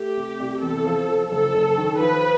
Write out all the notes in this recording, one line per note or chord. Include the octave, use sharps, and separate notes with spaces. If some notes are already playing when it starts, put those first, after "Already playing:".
Already playing: A3 G4
C3
C2
E2 A4
F3
F3
F#1 A4
F#1
D#3
F3 B4